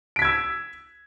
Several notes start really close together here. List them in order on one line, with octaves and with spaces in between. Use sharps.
D7 B6 G#6 E6